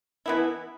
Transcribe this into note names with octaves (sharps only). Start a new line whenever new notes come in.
E3 B3 E4